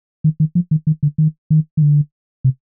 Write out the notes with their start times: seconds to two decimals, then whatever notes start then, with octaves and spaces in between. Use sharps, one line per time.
0.24 D#3
0.40 D#3
0.55 F3
0.71 D#3
0.87 D#3
1.03 D3
1.18 D#3
1.50 D#3
1.77 D#3
1.82 D3
2.44 C3